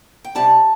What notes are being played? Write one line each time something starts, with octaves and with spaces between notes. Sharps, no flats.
G5
C3 G3 D4 A5